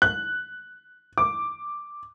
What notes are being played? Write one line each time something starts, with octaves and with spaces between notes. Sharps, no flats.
F#6
D6